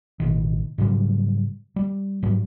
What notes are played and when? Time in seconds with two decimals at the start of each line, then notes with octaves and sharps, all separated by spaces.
0.20 A1 B2 D#3
0.78 G#2 C#3 F#3 G3
1.76 G3
2.22 G#2 F#3 G3